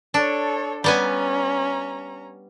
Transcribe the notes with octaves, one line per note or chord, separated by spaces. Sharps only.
D4 A4 C#5
G3 B3 C#4 G#5 A#5